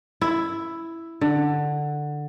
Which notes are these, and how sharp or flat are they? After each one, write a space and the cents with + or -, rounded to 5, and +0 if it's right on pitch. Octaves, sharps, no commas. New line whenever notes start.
E4 +5
D3 +10